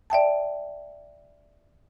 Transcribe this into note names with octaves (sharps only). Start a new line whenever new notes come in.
D5 E5 G5 A5